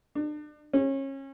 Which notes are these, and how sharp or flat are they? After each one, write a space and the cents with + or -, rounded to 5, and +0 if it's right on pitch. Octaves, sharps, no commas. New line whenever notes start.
D4 +35
C#4 -30